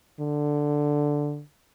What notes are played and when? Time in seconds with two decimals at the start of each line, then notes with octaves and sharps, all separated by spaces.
0.20 D3